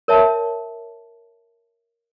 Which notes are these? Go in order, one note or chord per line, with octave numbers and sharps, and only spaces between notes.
A#4 C#5 E5 A5